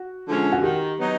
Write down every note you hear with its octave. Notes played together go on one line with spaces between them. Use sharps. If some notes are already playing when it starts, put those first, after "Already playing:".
Already playing: F#4
D3 F3 G#3 C#4
F#4
D#3 G4
F#3 B3 D#4